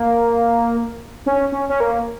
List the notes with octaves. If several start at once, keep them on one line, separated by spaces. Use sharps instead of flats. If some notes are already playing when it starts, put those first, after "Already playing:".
Already playing: A#3
C#4
C#4
C#4
A#3